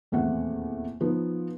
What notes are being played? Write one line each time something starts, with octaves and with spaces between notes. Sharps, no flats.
D#1 E2 A3 C4 F#5
F3 B3 D#4